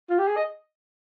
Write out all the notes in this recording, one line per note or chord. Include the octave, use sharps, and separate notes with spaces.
F4
G4
G#4
D#5